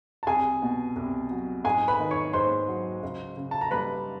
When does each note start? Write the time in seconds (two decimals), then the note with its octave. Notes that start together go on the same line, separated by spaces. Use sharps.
0.23 A5
0.27 C2 G#4 G#5
0.62 B2
0.96 C2
1.31 F#3
1.64 G#2 G#4 G#5
1.88 B4 B5
1.99 D#3
2.11 C#5 C#6
2.33 G#2 C5 C6
2.68 F#3
3.03 C#2
3.37 C#3
3.51 A5
3.61 A#5
3.71 G3 B4 B5